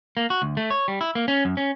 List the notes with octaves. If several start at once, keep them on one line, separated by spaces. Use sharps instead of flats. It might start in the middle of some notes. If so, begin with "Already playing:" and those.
A#3
F#4
D2
A3
C#5
G3
E4
A#3
C#4
F#2
C#4